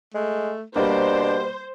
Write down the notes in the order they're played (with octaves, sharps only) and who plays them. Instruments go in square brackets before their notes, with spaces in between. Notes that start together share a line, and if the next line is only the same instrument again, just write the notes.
[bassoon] G#3 [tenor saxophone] A3
[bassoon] B2 [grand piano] G3 A#3 [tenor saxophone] D4 [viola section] C5